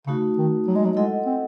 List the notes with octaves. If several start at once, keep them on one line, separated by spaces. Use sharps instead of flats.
C#3 A3 D#4 F#4
D#3
F#3
G#3
F#3
G#3 E4 A4 D#5 F#5
C4